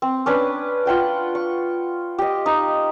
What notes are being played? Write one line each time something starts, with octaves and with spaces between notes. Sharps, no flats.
C4
C#4 D4 B4
F4 F#5 G5 D6
C#6
G4 D#5
D#4